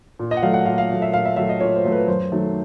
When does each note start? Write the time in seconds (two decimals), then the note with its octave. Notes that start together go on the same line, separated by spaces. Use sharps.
0.19 A#2
0.31 D#5
0.37 F#5
0.43 F#3 A3 F5
0.54 F#5
0.66 A#2 F5
0.78 F5
0.90 F#3 A3
1.02 E5
1.14 A#2 F5
1.25 E5
1.36 F#3 A3 E5
1.49 D#5
1.60 A#2 C#5
1.76 C5
1.85 F#3 A3
1.92 B4
2.08 F#2 C5
2.32 D#3 F#3 A3